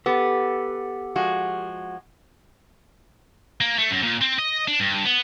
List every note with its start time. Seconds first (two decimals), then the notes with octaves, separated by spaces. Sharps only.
0.06 B3 G4 A4
1.15 F3 G#3 F#4
3.61 A#3
3.78 A3
3.91 F#2
4.03 A#2
4.21 C4
4.38 D#5
4.68 D4
4.80 G2
5.05 B3